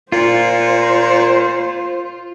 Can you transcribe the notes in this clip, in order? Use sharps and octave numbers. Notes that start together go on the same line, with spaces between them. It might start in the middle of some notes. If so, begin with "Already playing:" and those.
A#2 F4 C5